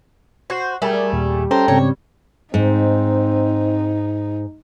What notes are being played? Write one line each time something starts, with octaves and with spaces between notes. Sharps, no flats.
F#4 C5
G3 A3 G#4 A#4
D#2 A#2
C#4 A4 C5 G5 A#5
G#2 C#3 C4 C#5
G#2 C4 D#4